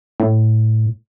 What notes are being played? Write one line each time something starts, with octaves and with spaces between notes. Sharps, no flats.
A2